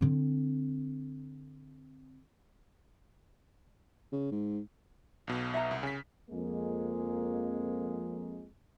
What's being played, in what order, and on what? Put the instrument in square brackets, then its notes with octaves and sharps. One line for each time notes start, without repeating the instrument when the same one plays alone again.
[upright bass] D3 C4
[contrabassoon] C#3
G#2
[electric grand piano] B1 B2
[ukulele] E5 F#5 A#5
[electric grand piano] C2
[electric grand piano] C#3 B6 [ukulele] G#5
[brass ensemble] F2 G#3 A#3